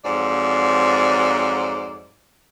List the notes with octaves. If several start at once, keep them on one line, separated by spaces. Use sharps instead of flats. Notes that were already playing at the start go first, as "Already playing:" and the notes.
F2 G#2 F#3 D5